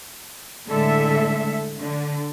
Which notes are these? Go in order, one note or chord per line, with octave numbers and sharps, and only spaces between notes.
A2 D3 G#3 A4 E5
D3